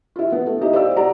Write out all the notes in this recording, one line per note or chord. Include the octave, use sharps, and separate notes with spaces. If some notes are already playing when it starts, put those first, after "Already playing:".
E4 F4
B3
A3
D#4 E4 G4 D#5
G4 C5 D5 F5 E6
F#4 G4 D5 F#5 A#5